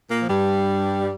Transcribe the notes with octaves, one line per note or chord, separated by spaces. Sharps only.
A#2 A#3
F3
G2 G3